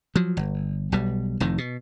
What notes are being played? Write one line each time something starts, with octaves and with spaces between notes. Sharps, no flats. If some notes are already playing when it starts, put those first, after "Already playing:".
F3 F#3
G1
B1 B2 G3
F1 F2 A2 D#3
B2